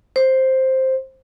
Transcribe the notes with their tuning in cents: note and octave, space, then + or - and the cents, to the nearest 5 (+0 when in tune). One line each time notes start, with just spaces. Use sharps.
C5 +5